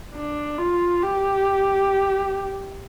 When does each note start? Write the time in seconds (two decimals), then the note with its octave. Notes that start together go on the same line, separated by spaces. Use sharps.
0.14 D4
0.58 F4
1.02 G4